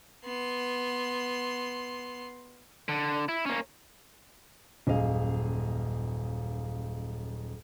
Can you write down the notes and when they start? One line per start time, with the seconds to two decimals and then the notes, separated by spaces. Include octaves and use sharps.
0.24 B3 C6
2.89 D3
3.29 E4
3.46 A#3 C#4
4.87 D#1 F#2 G#4 D#5 F5